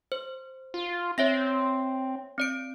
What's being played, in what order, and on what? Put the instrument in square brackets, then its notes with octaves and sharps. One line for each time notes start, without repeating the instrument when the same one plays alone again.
[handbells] C5
[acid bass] F4
[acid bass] C4 [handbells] C#5 E5 A#6
[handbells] C4 D5 D7